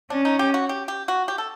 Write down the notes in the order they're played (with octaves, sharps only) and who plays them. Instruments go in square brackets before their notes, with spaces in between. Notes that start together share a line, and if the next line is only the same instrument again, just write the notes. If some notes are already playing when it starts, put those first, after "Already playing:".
[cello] C#4 [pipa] D4
[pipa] D#4
G4
F#4
G4
G4
F#4
G4
A4